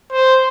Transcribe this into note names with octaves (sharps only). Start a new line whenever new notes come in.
C5